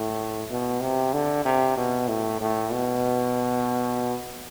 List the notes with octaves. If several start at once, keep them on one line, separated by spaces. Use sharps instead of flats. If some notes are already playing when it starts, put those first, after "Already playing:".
Already playing: A2
B2
C3
D3
C3
B2
A2
A2
B2